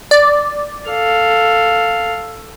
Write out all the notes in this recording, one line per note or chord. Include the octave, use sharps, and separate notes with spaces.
D5
A4 F5